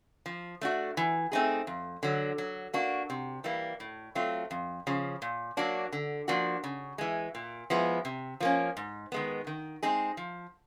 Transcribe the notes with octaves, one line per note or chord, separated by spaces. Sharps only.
F3
A3 D4 F#4
E3
A3 C4 D#4 G#4
F2
D3 F#3
F#3
A#3 D4 F#4
C3
E3 G3 A#3
A2
F#3 A3 C4 F4
F2
C#3 F3
A#2
F#3 A#3 D4 F#4
D3
F3 A#3 D4 F#4
C#3
E3 G#3
A#2
F3 G#3 B3 E4
C3
F3 A#3 C#4
G#2
D#3 G#3 B3
D#3
G#3 C4 D#4 G#4
F3